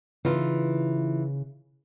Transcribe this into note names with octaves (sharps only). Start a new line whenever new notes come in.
C#3 E3 D#4 F4